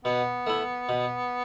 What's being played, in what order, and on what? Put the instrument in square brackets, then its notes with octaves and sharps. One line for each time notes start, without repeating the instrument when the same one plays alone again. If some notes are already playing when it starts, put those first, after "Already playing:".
[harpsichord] B2 [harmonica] B3
[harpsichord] A3 E4
B2